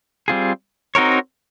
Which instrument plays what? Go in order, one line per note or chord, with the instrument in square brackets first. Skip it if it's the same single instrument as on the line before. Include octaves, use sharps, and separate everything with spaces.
[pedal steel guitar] G3 C4 F4 G#4
C4 D#4 F#4 A#4 C#5